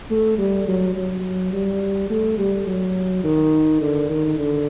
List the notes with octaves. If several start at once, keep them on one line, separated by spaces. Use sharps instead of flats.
A3
G3
F#3
F#3
G3
A3
G3
F#3
D#3
D3
D#3
D3